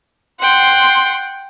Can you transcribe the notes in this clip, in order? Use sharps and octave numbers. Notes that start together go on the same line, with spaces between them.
F#5 G5 C6